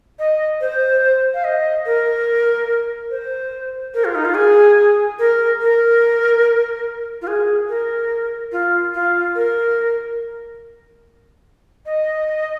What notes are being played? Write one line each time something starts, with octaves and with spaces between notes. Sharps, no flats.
D#5
C5
F5
D#5
A#4
C5
A#4
F4
D#4
F4
G#4
A#4
A#4
F4
G#4
A#4
F4
F4
A#4
D#5